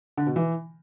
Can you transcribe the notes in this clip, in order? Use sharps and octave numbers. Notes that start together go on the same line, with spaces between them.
D3
B2
E3